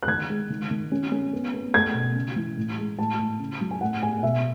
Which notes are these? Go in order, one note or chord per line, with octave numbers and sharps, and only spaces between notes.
F#6
D#3 G#6
G#3
D#3
D#3
C#4
C#4
B3
B3
A3 G#6
B2
C#3
E3
A2
G#3
A2 A5
A2
C#3
F#3
G#5
A2 F#5
A2 G#5
B2 E5